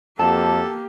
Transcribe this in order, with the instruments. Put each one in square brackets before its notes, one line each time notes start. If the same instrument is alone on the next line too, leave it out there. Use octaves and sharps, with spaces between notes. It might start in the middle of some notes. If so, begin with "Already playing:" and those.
[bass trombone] F2 [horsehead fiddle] A#3 G4 [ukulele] F#4 A5 [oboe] A4